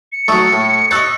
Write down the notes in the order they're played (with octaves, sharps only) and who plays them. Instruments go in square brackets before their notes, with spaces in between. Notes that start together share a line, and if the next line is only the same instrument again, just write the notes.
[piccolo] C#7
[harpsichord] F#3 A3 [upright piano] C#6 D#6 E6
[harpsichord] A2
[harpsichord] C#5 D#5 [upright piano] E6 F#6 A6